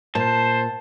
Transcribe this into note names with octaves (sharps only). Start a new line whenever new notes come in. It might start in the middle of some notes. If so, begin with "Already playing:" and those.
A#2 C5 A5